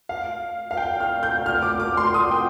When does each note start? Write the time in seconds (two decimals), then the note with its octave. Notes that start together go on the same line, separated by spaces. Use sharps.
0.09 F5
0.71 F5
0.77 G5
1.00 F6
1.23 G6
1.46 F6
1.63 D6
1.80 D6
1.97 C6
2.14 D#6
2.31 G5